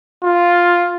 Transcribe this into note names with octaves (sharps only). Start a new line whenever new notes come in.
F4